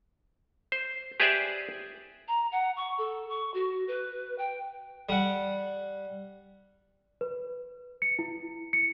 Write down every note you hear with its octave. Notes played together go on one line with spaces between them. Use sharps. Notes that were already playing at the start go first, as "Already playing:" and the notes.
C5
G4 G#4 B4 C5 D5 E5
A#5
F#5
C#6
A4
C#6
F#4
B4
G5
G3 F#5
B4
C#7
E4
C#7